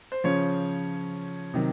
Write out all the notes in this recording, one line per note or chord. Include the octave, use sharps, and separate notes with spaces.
C5
C#3 F3 C#5
C3 D#3 F#3